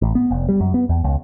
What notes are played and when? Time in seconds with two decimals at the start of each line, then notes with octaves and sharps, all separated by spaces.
0.02 A1
0.15 B3
0.31 F1
0.49 G3
0.61 F#2
0.74 B3
0.89 E2
1.04 C#2